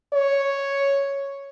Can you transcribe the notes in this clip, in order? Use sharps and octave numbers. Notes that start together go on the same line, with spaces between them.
C#5